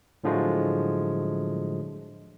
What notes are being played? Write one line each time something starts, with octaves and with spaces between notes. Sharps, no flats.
A2 D3 F3 F#3 G#3 A3